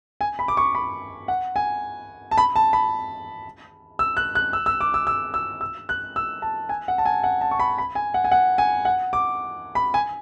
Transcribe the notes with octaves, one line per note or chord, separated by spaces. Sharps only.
G#5
B5
D6
C#6
B5
F#5
G#5
A5
B5
A5
B5
E6
F#6
F#6
E6
E6
D6
E6
E6
E6
E6
F#6
E6
A5
G#5
F#5
A5
G#5
F#5
A5
C#6
B5
B5
G#5
F#5
G#5
F#5
G#5
F#5
D6
B5
G#5